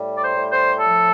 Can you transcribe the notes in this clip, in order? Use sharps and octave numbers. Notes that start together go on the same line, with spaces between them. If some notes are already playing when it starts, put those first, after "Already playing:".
Already playing: A2 G3
D5
C5
A2
C5
F3 A4